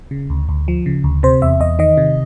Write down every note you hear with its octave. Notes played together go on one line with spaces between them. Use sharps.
C#3
D2
D2
F3
C#3
D2
C3 C5
E2 E5
E2 D#5
D#3 D#5
C3